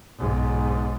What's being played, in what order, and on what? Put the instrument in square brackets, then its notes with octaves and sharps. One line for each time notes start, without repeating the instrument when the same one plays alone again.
[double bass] B1 G#2